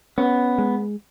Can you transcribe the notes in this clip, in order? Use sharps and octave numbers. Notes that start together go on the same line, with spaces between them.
B3 C#4
G#3